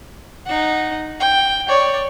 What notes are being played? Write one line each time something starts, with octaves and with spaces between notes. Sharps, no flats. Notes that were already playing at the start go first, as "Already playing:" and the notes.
D#4 F#5
G5
C#5 D5